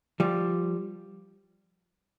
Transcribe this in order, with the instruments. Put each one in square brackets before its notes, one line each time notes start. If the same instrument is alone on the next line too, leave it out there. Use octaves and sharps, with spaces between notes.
[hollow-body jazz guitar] F3 G3